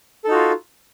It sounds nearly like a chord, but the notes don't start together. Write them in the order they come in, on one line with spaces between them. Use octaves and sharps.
A4 D#4 F#4 F4